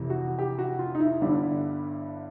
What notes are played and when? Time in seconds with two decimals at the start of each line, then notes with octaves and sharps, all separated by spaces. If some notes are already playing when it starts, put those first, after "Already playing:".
Already playing: F1 F2 C3 E3
0.10 F#4
0.39 G4
0.59 F#4
0.79 F4
0.95 D#4
1.00 E4
1.21 G1 G2 D3 G3